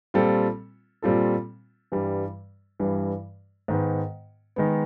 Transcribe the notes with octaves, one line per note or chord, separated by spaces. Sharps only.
A#2 G3 C4 F4 A4
A#2 G3 C4 F4 A4
G2 E3 G3
G2 E3 G3
G#2 D#3 G#3 B3
D#3 G#3 B3